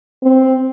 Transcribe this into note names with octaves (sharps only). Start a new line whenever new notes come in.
C4